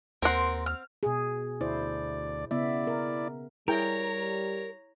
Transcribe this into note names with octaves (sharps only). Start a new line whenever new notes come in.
D#2 C4 A#4 F#5 C6
F6
B2 G#4
D2 E4 C5 D5
C#3 B3 E4 D5 E5
A#4
G3 E4 G#4 A#4 C#5 G5 A#5